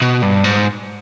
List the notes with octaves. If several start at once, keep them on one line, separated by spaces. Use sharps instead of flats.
B2
G2
G#2